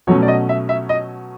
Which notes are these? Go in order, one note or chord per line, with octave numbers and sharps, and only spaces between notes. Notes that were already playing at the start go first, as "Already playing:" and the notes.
B2 F#3 A3 C#4 C#5
D5
D#5
E5
E5
D#5